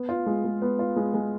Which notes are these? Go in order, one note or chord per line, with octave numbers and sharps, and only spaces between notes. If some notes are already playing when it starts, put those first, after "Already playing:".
Already playing: B3
F4
G#3
G#3
B3
F4
G#3
G#3